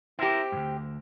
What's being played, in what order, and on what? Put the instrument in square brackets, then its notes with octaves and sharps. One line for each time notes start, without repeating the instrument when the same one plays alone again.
[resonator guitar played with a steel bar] C4 G4 [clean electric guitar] E4 A#4
[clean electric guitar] D2 G2